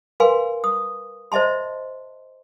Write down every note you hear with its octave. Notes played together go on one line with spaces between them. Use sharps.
A#4 B4 F5 G#5 C6
D#6
C5 D#5 E5 A5 C6